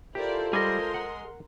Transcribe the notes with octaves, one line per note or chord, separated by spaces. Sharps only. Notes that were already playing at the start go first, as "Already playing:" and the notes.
E4 F4 G4 A4 A#4 C5 D5
G3 G#4 A#4 D#5 C6
F#5